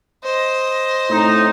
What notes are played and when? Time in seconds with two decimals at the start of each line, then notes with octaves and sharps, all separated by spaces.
0.24 C5 D#5
1.09 A2 C4 D#4